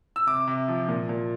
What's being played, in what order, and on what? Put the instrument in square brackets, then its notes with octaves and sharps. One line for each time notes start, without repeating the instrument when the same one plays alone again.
[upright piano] E6
C3 D6
C3
F3
A#2
A#2